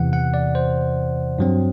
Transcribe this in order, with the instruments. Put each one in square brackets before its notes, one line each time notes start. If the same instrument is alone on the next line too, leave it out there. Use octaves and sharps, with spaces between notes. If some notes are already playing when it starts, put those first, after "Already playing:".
Already playing: [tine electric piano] E2 C3 E3 F#5
F#5
D5
C5
G2 F#3 C4